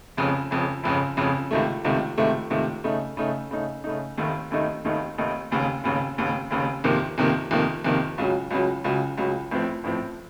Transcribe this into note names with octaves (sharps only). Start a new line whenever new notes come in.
F1 F2 C#3
F1 F2 C#3
F1 F2 C#3
F1 F2 C#3
C#2 C3 D#3 A3
C#2 C3 D#3 A3
C#2 C3 D#3 A3
C#2 C3 D#3 A3
C#3 A3 D#4
C#3 A3 D#4
C#3 A3 D#4
C#3 A3 D#4
F1 D#2 D#3 A3 D#4
F1 D#2 D#3 A3 D#4
F1 D#2 D#3 A3 D#4
F1 D#2 D#3 A3 D#4
F1 D#2 C#3
F1 D#2 C#3
F1 D#2 C#3
F1 D#2 C#3
F2 C3 D#3 A#3
F2 C3 D#3 A#3
F2 C3 D#3 A#3
F2 C3 D#3 A#3
C#2 C#3 F#3
C#2 C#3 F#3
C#2 C#3 F#3
C#2 C#3 F#3
A1 A2 F3 C4
A1 A2 F3 C4